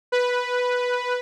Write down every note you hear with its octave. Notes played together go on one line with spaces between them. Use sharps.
B4